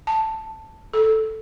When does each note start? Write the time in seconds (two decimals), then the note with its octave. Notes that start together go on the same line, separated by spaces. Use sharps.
0.07 A5
0.94 A4